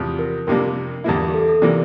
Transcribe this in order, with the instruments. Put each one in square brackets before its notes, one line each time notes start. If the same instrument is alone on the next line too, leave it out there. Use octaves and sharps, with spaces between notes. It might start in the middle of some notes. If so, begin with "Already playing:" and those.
Already playing: [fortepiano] E2 C3 F3
[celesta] A#4
[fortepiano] F2 C3 G3 A#3 D4 [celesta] A#4
[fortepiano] E2 D3 G3 A#3 E4
[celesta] G4
A4
A4
[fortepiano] C3 E3 A#3 [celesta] D5